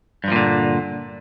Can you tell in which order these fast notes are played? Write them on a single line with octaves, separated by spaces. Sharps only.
G2 F3 A#2 D3